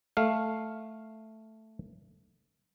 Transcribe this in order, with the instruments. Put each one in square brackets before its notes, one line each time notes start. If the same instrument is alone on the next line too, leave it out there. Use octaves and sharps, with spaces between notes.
[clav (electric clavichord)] A3 F5